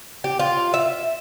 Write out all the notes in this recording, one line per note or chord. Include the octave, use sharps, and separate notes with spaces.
G4
F4
E5